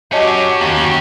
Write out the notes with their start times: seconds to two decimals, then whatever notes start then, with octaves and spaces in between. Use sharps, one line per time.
0.12 F#3 C#4 F#4 G4 C#5 D#5 A5
0.61 D#2